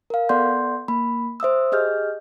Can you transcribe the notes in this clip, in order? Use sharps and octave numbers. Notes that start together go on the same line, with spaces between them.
A#4 F5
B3 A4 D5 F#5 C6 G6
A#3 B5
C5 E5 D#6 E6
G4 G#4 D#5 F6 G6